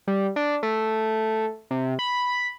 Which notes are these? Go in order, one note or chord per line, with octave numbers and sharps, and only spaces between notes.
G3
D4
A3
C3
B5